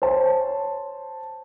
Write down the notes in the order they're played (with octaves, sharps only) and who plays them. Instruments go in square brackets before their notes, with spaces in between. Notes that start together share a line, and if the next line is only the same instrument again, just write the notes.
[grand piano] C5 C#5 A5